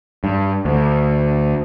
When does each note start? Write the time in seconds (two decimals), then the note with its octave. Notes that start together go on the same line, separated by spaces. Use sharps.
0.24 G2
0.65 D2